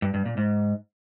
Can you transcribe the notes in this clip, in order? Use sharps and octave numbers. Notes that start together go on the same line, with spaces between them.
G2
G2
A#2
G#2